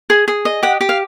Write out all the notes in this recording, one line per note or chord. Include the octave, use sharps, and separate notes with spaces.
G#4
G#4
D#5
G4 F#5
G4
F5